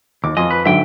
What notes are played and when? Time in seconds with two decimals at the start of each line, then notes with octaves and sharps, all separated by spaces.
0.24 D#2 D6
0.37 F2 D#5 G#5 C6
0.51 B4
0.65 G#2 D3 F#3 E5 G5